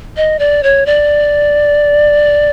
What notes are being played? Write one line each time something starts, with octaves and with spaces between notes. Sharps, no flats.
D#5
D5
C#5
D5